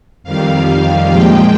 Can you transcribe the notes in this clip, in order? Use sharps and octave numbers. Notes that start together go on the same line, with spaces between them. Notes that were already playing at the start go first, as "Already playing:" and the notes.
F2 D#3 G3 F5
A#2 F3 G#3 G5